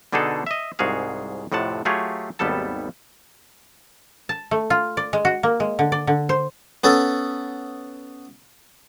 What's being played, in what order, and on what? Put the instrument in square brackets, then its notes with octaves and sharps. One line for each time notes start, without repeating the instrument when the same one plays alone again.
[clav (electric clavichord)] B2 D3 D4 D#4 G#4 A4
D#5 E5
C2 G#2 F#4 G#4 F5
F2 A2 C3 F#5 A5
F#3 A3 F4 G4 G#4 C#5
G#1 D#2 G3 B3 A4 A5
[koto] A5
A3
F4
D5
G#3
F#4
A#3
G#3
D3
D5
D3
C5
[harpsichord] B3 C#4 A4